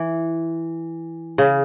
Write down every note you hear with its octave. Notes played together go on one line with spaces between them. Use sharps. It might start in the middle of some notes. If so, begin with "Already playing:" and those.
Already playing: E3
C#3